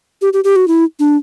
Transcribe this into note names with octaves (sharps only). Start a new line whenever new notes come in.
G4
G4
G4
F#4
E4
D4